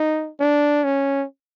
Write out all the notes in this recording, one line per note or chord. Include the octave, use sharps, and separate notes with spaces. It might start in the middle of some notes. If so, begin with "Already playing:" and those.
Already playing: D#4
D4
C#4